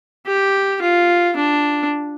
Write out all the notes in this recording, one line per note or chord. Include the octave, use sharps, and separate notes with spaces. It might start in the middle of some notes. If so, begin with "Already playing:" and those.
G4
F4
D4